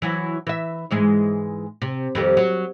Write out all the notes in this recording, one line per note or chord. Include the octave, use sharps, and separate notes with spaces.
E3 F#3 E4
E3 E5
G#2 E3 G#3
C3
F2 D#3 G3
F#3